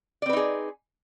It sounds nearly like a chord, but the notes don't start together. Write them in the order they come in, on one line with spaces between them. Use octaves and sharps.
D5 C4 B4 D#4 G#4